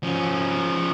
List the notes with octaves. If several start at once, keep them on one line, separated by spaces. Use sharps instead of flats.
F3 C#4